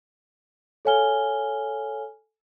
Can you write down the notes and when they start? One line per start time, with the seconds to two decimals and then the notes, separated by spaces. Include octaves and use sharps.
0.85 A4 C#5 F5 G#5 F6 G7